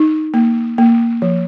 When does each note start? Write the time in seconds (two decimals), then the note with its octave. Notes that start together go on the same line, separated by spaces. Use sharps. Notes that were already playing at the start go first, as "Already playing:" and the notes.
Already playing: D#4
0.34 A#3
0.78 A#3
1.22 F3